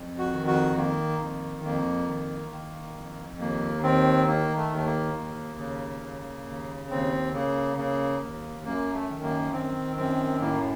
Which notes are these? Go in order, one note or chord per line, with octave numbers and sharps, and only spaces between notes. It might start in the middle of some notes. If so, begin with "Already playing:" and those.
Already playing: F2
F#4
D#3
F#4
D#3 A#3
F2
F2 A#3
D#3
D#3
F2
D#2 A#3
D#3 C4
D#3 A#3
A3
D#2
A3
A#3
D#2
C#3
C#3
D#2
D#2 C4
C#3 A#3
C#3 A#3
D#2
F#2 A#3
A3
D#3
A#3
D#3 C4
F#2 C4
A2 A#3